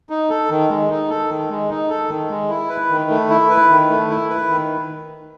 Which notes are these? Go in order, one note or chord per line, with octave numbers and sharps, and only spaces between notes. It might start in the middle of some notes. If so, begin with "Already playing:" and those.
D#4
A4
D#3
G#3
D#4
A4
D#3
G#3
D#4
A4
D#3
G#3
E4
B4
D#3
A3
E4
B4
D#3
A3
E4
B4
D#3